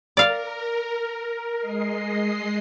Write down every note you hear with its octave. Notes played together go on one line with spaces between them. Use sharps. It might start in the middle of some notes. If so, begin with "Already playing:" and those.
A#4 D5 F5
G#3 D#5 C7